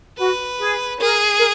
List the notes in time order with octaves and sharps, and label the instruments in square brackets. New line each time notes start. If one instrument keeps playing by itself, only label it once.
[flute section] F#4 [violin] B4
[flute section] G#4
[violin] G#4 [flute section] A#4
[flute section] A#4